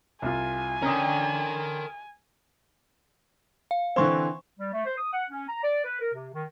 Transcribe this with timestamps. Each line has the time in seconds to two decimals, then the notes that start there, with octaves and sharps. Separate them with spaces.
0.22 C2 F4 G#5
0.82 D3 C#4 A#4 G5 A#5 D#6
3.71 F5
3.96 D3 E3 C4 C5 C6 C#6
4.59 G3
4.73 A3
4.85 C5
4.98 D#6
5.12 F#5
5.31 C#4
5.48 A#5
5.63 D5
5.84 B4
6.00 A#4
6.14 C3
6.33 D#3